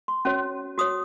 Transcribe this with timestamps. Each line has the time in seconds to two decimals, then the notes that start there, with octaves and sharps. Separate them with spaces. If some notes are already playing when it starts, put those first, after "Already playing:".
0.08 C6
0.25 C#4 F#4 C#5
0.78 F#4 C#5 D#6